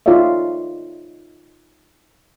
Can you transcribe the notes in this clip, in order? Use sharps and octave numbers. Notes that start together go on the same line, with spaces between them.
D#4 F4 A4 C#5 D5 E5